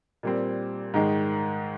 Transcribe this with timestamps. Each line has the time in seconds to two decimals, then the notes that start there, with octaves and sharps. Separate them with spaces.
0.23 A#2 G3 C4
0.94 G#2 D#3 G#3